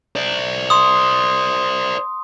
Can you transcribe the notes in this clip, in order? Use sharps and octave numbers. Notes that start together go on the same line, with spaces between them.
C5 D5
C6 D#6